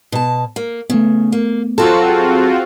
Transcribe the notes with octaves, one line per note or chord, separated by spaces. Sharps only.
B2 A5
A#3
C#3 A3 B3
A#3
F#3 C4 F4 F#4 A4
G#4